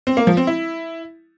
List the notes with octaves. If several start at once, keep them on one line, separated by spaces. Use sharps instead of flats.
C4
A#3
F3
C4
E4